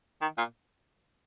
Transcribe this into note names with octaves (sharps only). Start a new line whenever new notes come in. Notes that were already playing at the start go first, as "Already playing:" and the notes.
D#3
A#2